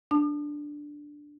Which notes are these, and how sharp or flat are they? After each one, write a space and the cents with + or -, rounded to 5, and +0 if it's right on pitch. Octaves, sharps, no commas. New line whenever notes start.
D4 +0 A5 +0 D#6 -45